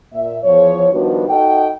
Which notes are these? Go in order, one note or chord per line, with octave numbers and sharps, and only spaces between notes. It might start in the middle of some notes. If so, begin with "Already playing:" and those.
A#2 E5
E2 F3 C#5
D#3 F3 G3 B3 D4 F#4
D#4 F#4 A4 D#5 F#5 G5